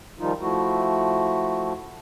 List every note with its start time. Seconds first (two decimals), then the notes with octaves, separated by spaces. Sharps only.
0.19 D#3 F3 G3 D#4 F4
0.41 F3 A3 E4 F#4